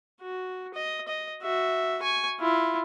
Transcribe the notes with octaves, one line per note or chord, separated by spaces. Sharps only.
F#4
D#5
D#5
F#4 E5
G#5 C#6
E4 F4